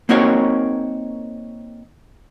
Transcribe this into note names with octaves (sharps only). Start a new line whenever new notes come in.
A#3 C4 D#4 F#4 A#4 C#5